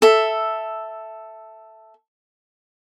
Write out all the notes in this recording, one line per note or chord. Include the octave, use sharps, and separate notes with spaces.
A4 E5